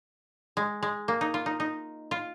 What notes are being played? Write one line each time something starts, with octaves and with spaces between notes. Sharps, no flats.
G#3
G#3
A#3
D#4
F4
D#4
D#4
F4